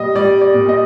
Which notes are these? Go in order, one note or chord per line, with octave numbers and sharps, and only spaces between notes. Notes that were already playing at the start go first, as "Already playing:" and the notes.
Already playing: A#2 G3 D#5
G3 D5
D5
A#2
D#5